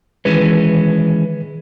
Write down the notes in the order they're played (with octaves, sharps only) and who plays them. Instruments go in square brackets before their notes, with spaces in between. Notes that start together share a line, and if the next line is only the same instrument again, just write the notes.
[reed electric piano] D#3 B4 [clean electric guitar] E3 G#3 C#4